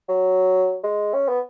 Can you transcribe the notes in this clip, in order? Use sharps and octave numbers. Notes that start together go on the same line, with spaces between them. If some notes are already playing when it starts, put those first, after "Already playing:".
F#3
G#3
C#4
B3